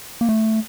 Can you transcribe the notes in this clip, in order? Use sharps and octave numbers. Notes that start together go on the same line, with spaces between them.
A#3
A3